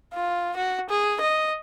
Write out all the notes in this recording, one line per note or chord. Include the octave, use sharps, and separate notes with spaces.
F4
F#4
G#4
D#5